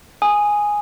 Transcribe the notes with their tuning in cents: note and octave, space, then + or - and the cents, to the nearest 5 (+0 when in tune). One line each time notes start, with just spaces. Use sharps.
G#5 +0 D#6 -5